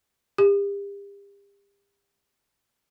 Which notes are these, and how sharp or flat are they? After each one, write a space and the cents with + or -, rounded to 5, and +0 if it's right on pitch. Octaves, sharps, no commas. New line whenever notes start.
G4 +40